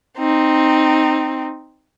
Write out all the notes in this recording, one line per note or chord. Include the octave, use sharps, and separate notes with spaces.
C4 D#4